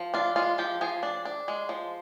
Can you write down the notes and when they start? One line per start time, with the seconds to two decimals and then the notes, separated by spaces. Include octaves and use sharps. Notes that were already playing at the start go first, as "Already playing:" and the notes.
Already playing: F3
0.14 D4 F4
0.36 G#3 F4
0.58 F3 G4
0.81 F3 G#4
1.03 D4
1.25 D4
1.48 G#3
1.69 F3